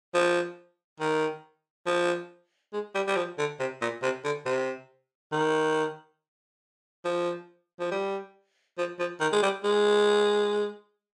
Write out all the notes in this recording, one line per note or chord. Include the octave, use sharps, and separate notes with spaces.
F3
D#3
F3
G#3
G3
G3
F3
D3
C3
A#2
C3
D3
C3
D#3
F3
F3
G3
F3
F3
D#3
G#3
G3
G#3